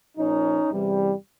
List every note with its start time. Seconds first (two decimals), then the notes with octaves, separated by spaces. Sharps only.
0.17 A#2 F3 C#4 D#4
0.70 E2 C3 E3 G3